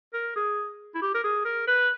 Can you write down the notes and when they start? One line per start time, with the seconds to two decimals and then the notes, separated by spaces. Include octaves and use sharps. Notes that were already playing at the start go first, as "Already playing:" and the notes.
0.14 A#4
0.36 G#4
0.95 E4
1.02 G4
1.14 A#4
1.24 G#4
1.45 A#4
1.67 B4